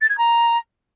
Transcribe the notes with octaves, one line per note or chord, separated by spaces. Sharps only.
A6
G#6
A#5